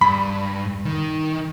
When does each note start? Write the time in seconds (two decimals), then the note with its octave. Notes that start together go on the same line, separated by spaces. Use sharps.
0.01 G2 B5
0.85 D#3